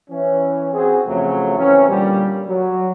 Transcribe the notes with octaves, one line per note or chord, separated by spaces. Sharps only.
E3 C#4
C4 F#4 G#4
F2 A2 C#3 F#3 A3
E3 F#3 C4 C#4
A#2 D3 G3
F#3